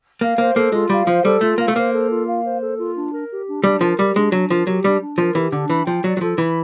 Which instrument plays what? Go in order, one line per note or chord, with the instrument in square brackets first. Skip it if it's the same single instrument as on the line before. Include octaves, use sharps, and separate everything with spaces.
[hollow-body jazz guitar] A#3 [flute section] F5
[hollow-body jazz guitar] A#3 [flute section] C5
[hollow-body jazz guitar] A#3 [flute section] A4
[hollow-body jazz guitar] G#3 [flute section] F4
[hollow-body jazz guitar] G3 [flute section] F5
[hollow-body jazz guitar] F3 [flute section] C5
[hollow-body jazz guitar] G3 [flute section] A4
[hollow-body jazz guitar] A3 [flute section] F4
[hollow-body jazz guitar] A#3 [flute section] F5
[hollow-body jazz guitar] A3
[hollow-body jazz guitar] A#3 [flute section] C5
[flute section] A4
F4
F5
C5
A4
F4
D4
A#4
G4
D4
[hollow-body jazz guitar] G3 [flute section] D4
[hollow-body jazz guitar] F3 [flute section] A#4
[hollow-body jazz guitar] G3 [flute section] G4
[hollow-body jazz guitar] G#3 [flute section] D4
[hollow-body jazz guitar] F#3 [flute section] D4
[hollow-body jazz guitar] F3 [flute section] A#4
[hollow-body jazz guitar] F#3 [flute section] G4
[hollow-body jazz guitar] G3 [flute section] D4
[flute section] D4
[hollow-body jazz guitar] F3 [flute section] A#4
[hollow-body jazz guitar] E3 [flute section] G4
[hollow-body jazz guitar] D3 [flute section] D4
[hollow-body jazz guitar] E3 [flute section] B5
[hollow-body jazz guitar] F3 [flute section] G5
[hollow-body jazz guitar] F#3 [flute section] D5
[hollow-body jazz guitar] F#3
[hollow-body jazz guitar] F3 [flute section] A4
[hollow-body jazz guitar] E3 [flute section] B5